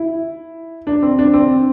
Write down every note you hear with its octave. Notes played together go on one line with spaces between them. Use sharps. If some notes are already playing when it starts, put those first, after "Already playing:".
Already playing: E4
D4
C4
D4
C4